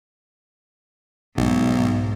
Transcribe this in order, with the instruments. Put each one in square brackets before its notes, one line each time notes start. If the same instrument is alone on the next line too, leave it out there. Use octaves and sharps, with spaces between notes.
[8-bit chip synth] B1 [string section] G#2